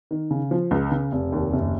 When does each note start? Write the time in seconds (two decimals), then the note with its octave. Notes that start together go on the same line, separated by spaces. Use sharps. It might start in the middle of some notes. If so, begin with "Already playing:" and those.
0.11 D#3
0.31 C#3
0.51 F3
0.71 C#2
0.92 C#3
1.12 F1
1.32 D#2
1.53 F#1